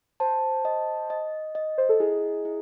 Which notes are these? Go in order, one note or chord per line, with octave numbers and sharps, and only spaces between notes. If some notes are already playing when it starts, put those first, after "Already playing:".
C5 A5
D#5
D#5
D#5
C5
A4
E4 G#4
E4